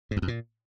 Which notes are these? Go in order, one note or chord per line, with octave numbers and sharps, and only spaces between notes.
G#2
E2
F2
A#2